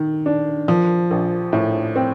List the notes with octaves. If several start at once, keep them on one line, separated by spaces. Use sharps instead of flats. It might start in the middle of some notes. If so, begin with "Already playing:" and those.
Already playing: D#3
D4
F3
A#1
A2
C4